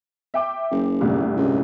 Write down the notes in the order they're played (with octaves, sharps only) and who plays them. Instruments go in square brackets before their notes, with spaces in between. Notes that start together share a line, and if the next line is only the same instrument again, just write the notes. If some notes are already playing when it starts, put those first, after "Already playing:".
[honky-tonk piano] E5 G5 D6
[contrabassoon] F#1
[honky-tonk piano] G1 C2 A2
[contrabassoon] C#2